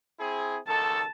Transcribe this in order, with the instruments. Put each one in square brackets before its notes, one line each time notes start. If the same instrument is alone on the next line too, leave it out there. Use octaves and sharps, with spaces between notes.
[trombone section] C4 E4 G#4
[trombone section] C#2 D#3 A4 [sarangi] A5